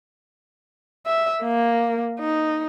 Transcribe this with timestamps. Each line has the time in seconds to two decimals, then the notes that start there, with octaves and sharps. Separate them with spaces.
1.07 E5
1.43 A#3
2.20 D#4